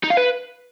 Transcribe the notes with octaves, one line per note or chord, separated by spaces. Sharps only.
D#4
F5
B4